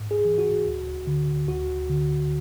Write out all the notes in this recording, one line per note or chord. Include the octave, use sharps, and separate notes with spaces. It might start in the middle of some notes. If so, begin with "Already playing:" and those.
Already playing: G#2
G#4
E3
F#4
D2
D3
D2 F#4
D3